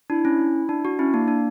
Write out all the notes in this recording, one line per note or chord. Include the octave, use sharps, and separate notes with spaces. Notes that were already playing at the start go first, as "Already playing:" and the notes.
D4 E4
C#4
D4
F#4
C#4 E4
A#3 D4
D4